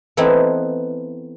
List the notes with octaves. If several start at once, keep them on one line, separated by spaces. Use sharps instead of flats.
E3 A3 B3 C4 D#4 E4